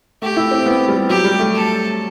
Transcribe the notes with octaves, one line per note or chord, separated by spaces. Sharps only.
A3 G4
E4
C4
B3
G3
F#3 G4
G3
A3
A4